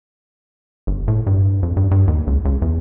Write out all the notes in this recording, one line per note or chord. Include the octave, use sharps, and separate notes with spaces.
G1
A2
G2
F2
G2
G2
D#2
C#2
C#2
E2